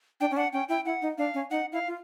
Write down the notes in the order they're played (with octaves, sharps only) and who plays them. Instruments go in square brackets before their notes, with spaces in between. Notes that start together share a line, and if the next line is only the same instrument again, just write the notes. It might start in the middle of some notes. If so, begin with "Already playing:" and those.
[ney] D4 [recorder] G5
[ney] C#4
[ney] D4 [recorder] F#5
[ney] C#4 [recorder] G5
[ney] E4 [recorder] G5
[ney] E4 [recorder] F#5
[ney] D#4
[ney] D4 [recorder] F5
[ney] C#4
[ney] D#4 [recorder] F#5
[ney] E4 [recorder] F5
[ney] F4